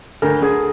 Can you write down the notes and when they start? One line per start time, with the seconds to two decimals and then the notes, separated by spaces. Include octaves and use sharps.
0.22 D2 A#4
0.42 D3 G#4